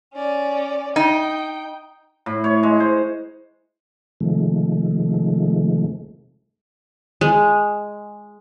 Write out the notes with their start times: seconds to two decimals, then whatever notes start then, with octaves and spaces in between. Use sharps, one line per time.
0.14 C#4 D5
0.96 D#4 G5
2.26 A2
2.44 C#5
2.63 G#3
2.80 C5
4.21 C3 D#3 F3 G#3 A3
7.21 G#3